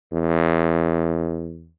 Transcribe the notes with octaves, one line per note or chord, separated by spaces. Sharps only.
E2